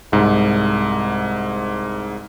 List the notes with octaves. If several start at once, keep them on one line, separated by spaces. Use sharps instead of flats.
C2 G#2